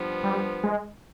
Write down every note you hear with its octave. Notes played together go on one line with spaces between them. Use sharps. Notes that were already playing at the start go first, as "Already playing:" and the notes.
Already playing: G2 F3 B3
G3
G#3